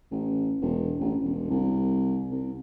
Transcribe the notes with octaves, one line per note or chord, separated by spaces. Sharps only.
A1
E1
A1
E1
C2
C2